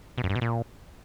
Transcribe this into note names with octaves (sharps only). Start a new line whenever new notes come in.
B2
F#2
G2
B2
A#2